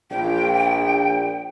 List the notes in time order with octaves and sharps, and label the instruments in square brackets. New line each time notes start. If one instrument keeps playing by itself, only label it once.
[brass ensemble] A#1 [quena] G5